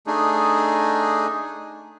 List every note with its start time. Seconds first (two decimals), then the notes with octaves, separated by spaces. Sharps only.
0.07 A3 D4 D#4 G#4